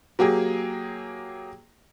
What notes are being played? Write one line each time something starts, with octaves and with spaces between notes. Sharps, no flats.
F#3 A#3 G4 G#4